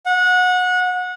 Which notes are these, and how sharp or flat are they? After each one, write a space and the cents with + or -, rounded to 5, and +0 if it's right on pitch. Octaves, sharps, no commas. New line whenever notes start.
F#5 -25